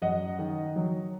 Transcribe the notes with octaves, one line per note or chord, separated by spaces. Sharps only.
F#2 D#5 F#5
D#3
F#3